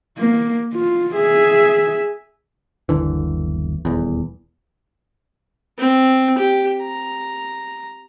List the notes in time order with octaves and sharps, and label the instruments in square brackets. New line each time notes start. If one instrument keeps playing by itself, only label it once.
[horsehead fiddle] A#3
F4
G#4 E5
[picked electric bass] G1 D#2 D3 E3
D#1 E2
[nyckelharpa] C4
G4
A#5